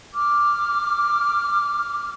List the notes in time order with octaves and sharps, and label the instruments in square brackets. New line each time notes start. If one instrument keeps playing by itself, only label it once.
[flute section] D6 F6